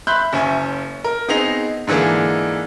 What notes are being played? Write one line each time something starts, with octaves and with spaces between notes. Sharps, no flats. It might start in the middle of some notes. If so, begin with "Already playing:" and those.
E5 B5 C6 F#6 G6
F#1 C#4 E5 G#5
A#4
B3 C4 D#4 G#4 A#6 F7
G#2 D3 E3 A#3 G#4